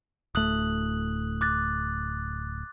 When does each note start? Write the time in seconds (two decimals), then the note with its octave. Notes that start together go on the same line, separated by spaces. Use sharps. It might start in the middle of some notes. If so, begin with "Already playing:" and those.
0.35 D1 A3 D#6 F#6 F#7
1.41 D6 F#6 A6